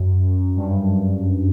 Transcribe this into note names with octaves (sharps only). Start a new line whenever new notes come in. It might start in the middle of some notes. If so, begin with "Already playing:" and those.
Already playing: F#2
G2